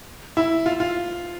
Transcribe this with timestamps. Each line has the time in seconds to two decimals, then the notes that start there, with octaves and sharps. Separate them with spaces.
0.37 E4
0.66 F4
0.80 F4